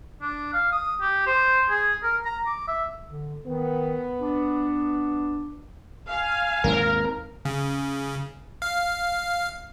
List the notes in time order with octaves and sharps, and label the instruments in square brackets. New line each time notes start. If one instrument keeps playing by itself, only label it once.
[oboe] D4
F5
D#6
G4
C5
G#4
A#4
A#5
D6
E5
[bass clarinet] D3
[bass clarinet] D#3 [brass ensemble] B3
[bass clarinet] D4
[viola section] F5 [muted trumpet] G#5
[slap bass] D#2 G#2 C4 [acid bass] A#4
[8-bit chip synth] C#3
F5